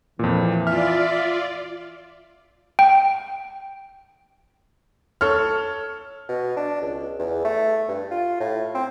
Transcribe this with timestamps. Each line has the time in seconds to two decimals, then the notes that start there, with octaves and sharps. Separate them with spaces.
0.19 F2 A#2 E3
0.67 F4 D5 E5 F6
2.79 G5
5.21 A4 C#5 F6
6.29 B2
6.57 D4
6.81 C#2
7.19 E2
7.45 A3
7.88 G2
8.11 F4
8.40 A2
8.75 C4